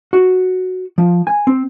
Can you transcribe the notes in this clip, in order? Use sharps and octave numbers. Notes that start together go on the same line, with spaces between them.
F#4
F3
G#5
C4